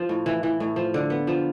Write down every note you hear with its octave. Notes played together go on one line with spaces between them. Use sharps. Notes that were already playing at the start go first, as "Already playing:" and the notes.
Already playing: F3
A2
E3
E3
A2
F3
D3
B3
F3